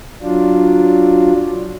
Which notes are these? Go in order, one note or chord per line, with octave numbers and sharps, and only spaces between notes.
F#3 D4 F4